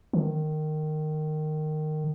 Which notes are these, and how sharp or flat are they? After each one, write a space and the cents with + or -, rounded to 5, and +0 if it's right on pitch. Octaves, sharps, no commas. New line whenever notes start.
D#3 -15